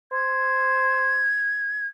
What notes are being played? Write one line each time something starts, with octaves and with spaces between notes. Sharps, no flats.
C5 G#6